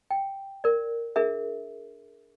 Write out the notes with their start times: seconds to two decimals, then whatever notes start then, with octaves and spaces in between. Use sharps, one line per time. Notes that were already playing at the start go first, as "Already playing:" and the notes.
0.11 G5
0.64 A#4 D5
1.16 D4 G#4 A#4 E5